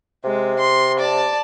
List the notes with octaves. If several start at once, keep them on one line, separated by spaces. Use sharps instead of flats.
C3 G#3
C6
D5 A5